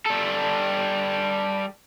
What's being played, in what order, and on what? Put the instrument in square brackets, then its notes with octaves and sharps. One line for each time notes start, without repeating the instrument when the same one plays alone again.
[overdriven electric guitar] G3 A4